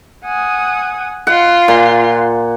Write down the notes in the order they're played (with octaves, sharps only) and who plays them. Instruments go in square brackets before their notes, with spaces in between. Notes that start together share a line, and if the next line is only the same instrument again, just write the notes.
[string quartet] F#5 G#5 D#6
[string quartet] F4 C6 [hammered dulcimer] F#5
[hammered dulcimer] A#2